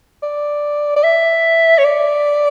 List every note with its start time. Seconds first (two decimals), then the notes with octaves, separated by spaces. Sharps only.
0.23 D5
0.96 D5
1.04 E5
1.78 C#5
1.84 D5